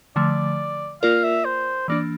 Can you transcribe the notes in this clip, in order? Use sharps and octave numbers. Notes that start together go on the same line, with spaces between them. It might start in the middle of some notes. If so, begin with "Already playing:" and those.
D3 F3 A3 D5
A#3 F4 A#4 D5 F5
E5
C5
E3 A#3 D4 D5